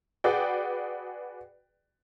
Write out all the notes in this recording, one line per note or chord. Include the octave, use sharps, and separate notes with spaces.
F#4 G#4 B4 D5 G5